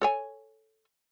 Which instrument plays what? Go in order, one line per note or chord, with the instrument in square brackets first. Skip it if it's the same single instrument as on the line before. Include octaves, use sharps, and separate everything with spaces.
[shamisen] A4 C#5 G#5